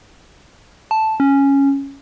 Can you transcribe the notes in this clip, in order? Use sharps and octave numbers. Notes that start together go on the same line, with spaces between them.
A5
C#4